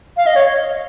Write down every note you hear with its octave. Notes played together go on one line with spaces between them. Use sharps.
F5
D#5
C#5